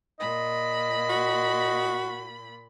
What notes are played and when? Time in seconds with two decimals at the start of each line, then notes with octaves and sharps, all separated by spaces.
0.20 A#2 D#5 B5
1.09 F#4